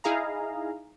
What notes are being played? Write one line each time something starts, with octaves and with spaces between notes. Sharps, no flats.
D#4 E4 G#4 F5 A#5